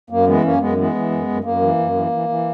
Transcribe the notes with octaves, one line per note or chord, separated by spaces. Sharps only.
F#2 A#3
E3 G#3 B3
F#2 A#3 C#4
F#2 G#3 B3
E3 G#3 B3
E3
F#2
F#2
F#2 A#3
E3
F#2
E3
E3
E3